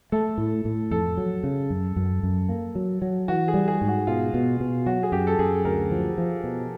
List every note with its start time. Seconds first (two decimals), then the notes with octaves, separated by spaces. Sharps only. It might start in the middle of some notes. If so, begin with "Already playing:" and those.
0.12 A3 A4
0.38 A2
0.65 A2
0.91 F2 A4
1.17 F#3
1.44 C#3
1.70 F#2
1.96 F#2
2.23 F#2
2.49 A#3
2.75 F#3
3.02 F#3
3.28 E3 F#4
3.48 G#4
3.54 G3
3.68 G#4
3.81 G#2
3.88 F#4
4.07 B2 F4
4.34 B2
4.60 B2
4.86 F#3 F#4
5.03 G#4
5.12 F#2 G4
5.27 A4
5.39 F#2 G#4
5.65 D2 A#4
5.92 F3
6.18 F3
6.44 B2